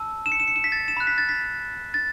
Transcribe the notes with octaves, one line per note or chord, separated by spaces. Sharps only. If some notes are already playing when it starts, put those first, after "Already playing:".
Already playing: A5 E6
E7
C#7
E7
C#7
E7
B6
A6
E7
B5 F#6
B6
A6
B6
A6